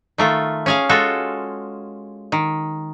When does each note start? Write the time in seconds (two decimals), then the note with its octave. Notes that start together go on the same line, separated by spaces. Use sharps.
0.18 D#3 A3 F4
0.66 C#4 G#4 F5
0.89 G#3 F4 F#4 A4
2.32 D#3